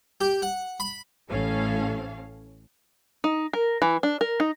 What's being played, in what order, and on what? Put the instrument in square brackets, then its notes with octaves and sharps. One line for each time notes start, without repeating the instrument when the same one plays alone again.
[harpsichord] G4
F#5
B5
[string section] A1 A2 C#4 A4 F5
[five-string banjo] D#4
A#4
E3
D4
A#4
D#4